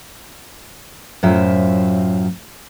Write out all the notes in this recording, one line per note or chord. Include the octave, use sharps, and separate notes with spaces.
F#2 A2 F#3 F4 C5 E5